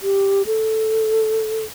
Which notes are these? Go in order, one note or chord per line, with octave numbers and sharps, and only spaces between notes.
G4
A4